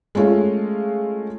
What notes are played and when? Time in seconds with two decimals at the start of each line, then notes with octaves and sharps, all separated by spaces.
0.15 G#3 A3 C#4 F4